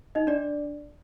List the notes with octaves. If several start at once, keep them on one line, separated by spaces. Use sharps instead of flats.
D#4 D#5
D4 D5